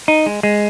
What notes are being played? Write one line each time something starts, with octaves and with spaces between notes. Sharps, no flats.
D#4
G#3
G#3